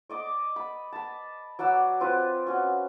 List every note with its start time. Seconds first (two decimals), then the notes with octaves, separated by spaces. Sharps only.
0.09 D5 D#5 D6
0.56 B5
0.92 A5 B5
1.59 F#3 D5 F#5 E6
2.00 C4 F4 B4
2.47 C#4 F#4